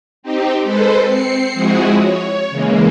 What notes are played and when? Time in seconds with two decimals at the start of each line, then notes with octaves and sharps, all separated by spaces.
0.23 C4 D#4 G4
0.63 G#3 A4 B4 C5
1.04 C4 C7 C#7
1.54 F3 G#3 C4 E4 F#4 G#4
1.97 C#5
2.51 C#3 E3 G#3 A#3